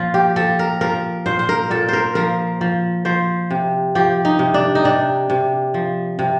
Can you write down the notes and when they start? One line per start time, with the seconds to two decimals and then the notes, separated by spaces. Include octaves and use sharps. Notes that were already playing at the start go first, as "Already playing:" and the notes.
Already playing: A#2 F3 F4
0.14 G4
0.36 F3 A4
0.59 A#4
0.81 F3 A#4
1.26 A#2 C5
1.39 C5
1.49 A#4
1.70 A#2 A4
1.89 A#4 C5
2.15 F3 A#4
2.61 F3
3.05 F3 C5
3.51 C3
3.95 F3 G4
4.25 D#4
4.39 C3
4.54 D4
4.75 D#4
4.84 C3 D4
5.30 C3
5.74 F3
6.19 C3